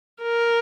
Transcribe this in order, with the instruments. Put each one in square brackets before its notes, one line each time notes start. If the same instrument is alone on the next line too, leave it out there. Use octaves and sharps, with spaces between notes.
[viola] A#4